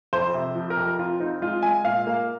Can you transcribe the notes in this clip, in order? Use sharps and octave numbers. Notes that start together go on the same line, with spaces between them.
F2 C5
C3
F3
A#4
F2
C4 F4
C4 D#4
G#3 F4
G#3 G#5
A#2 F5
A#3